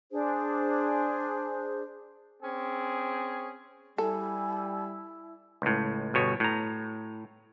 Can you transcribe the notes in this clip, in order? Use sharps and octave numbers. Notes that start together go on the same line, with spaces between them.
D4 G#4 C5
C4 C#4 G#4
G3 E4 A4 G#5
C#2 A2
G1 B2 C#5
A2 A#5